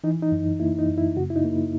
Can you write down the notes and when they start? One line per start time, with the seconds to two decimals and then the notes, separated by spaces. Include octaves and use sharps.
0.04 E3 D#4
0.23 D#4
0.32 F#2
0.60 A#3 E4
0.79 D#4
0.89 F#2
0.98 E4
1.16 C#3 F#4
1.30 E4
1.36 D#4
1.45 A#3